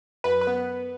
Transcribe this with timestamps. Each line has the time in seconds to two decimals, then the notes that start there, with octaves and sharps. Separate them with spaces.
0.24 F#2 B4
0.41 B4
0.47 B3